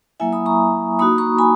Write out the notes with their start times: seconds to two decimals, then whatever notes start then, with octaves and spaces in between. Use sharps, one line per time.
0.20 F#3 A#3 E4 E5 G#5
0.33 B5 D#6
0.46 A#5 C#6
0.99 A#3 D#4 F#4 B5 D#6
1.18 A#5 C#6
1.38 G#5 B5